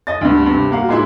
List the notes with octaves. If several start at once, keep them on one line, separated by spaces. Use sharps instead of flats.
D#5 A6
D2 G2
G2 C3
A#3 F#4 F5
A#2 G#3 E4